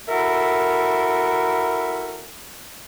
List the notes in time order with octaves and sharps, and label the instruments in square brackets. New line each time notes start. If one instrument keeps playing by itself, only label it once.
[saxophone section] E4 F#4 A4 A#4 E5